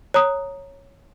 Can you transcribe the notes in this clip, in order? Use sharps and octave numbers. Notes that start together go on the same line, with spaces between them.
C#5 A#5 D#6